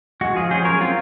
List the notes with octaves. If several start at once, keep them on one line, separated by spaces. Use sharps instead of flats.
G#3 F#4
F3 F4 G#4
C#4 G#4 C5
F#3 A#4 C#5
C4 F4